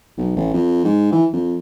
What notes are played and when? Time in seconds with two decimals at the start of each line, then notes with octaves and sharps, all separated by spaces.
0.18 B1
0.36 A1
0.54 F2
0.85 G#2
1.12 E3
1.33 F2